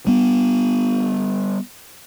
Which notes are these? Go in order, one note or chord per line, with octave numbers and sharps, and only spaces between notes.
G3 B3